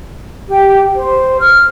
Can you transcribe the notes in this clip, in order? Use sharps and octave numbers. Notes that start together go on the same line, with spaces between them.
G4
C5
F6